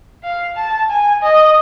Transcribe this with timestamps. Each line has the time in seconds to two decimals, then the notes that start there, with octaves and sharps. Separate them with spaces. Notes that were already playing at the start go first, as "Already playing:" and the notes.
0.23 F5
0.56 A5
0.89 G#5
1.22 D#5